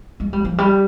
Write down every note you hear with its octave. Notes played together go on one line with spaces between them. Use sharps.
G#3
G3
F3
G3